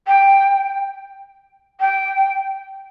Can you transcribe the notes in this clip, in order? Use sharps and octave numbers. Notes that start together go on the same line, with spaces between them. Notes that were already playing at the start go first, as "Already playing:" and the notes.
G5
G5